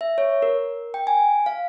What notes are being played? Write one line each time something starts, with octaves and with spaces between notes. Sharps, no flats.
E5
C#5
A#4
G5
G#5
F5